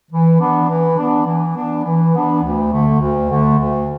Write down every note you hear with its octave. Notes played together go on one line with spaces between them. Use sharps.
E3
B3 D4
E3
B3 D4
E3
B3 D4
E3
B3 D4
D2
D3 A3
D2
D3 A3
D2